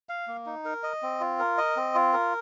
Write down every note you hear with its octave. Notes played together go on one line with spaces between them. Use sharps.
F5
A#3
D#4
A#4
D#5
C4
F4
A#4
D#5
C4
F4
A#4